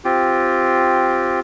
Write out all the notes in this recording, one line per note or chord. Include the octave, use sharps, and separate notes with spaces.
C4 F4 G4